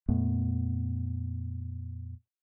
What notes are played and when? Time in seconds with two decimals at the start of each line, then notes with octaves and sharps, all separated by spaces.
0.09 F2 A#2 A3 B3